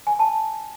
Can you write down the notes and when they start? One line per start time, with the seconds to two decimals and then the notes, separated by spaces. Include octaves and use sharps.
0.07 G#5
0.19 A5